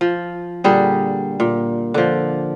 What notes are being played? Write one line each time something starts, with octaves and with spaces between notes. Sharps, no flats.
F3
A#2 D3 G3 G#4
A#2
D3 F3